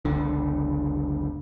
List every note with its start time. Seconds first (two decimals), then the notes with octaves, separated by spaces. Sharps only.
0.05 F#1 C#2 D3